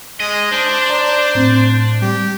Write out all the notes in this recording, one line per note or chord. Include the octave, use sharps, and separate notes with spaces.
G#3 D#5
D4 C5
D5 A#5
A2 C4
G3 G4